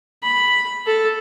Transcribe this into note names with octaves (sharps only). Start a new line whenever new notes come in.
B5
A4